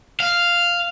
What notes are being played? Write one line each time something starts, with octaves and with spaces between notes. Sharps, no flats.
F5